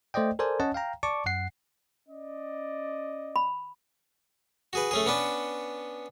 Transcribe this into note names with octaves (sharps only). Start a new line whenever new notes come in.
A3 C5 D5 D#5 G5
A4 A#4 C5 D5 G#5
C#4 C#5 D#5 F#5 A5
F5 G5 A#5
D5 A5 C#6 D6
F#2 F#5 C7
C#4 D5 D#5
B5
F#4 G#4 B4
A3 C#4 G#4
B3 C#4 D4 B4